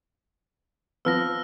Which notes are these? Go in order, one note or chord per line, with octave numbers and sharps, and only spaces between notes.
F3 B3 E6 F6 A#6